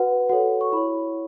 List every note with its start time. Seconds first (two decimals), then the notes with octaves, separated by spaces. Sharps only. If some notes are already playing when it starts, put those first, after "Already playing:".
Already playing: F#4 B4 F#5
0.29 F#4 A4 C#5 F#5
0.61 C#6
0.72 E4 C#5 B5